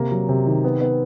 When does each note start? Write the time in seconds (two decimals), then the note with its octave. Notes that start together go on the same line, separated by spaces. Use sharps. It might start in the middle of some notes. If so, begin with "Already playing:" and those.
Already playing: C3 A#3
0.11 F#3
0.29 C3
0.46 D#3
0.64 B3
0.81 B3